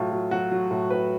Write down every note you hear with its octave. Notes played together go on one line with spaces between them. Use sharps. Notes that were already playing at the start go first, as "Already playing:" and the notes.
Already playing: A2 F#3 F4
F#3
F#3 F#4
F#3
A2
A2 B4